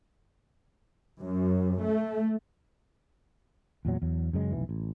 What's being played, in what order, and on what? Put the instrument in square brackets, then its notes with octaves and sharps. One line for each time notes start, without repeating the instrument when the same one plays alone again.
[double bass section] F#2
A3
[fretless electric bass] E2 A#2 F#3
E2 F#3
F#2 C#3 G#3
F1 B1 E3
A1